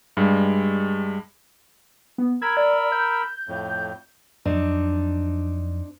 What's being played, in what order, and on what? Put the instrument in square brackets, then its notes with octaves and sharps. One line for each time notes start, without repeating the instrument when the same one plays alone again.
[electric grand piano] G2 G3 G#3
[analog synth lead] B3
[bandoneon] A#4 B5 E6 [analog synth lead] G#6
[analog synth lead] D5
G6
[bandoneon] F2 A2
[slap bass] F2 F#3 [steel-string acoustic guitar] C4 D4 D#4